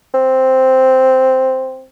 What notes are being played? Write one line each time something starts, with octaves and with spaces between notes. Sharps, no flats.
C4